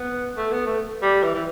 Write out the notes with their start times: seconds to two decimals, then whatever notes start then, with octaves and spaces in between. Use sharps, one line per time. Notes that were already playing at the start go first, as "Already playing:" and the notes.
Already playing: B3
0.37 A3
0.52 B3
0.66 A3
1.02 G3
1.24 E3
1.35 E3